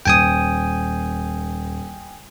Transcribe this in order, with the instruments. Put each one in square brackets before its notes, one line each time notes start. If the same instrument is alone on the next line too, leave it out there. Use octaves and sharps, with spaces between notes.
[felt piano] D#1 [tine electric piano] G5 G#5 D#6